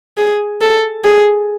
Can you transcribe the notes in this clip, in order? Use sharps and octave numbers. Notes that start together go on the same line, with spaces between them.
G#4
A4
G#4